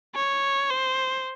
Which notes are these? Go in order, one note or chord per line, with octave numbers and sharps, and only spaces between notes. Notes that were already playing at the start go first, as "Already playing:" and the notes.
C#5
C5